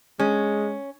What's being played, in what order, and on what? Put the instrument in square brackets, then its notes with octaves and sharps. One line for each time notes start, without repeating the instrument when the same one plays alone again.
[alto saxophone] G#3 [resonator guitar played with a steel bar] C#4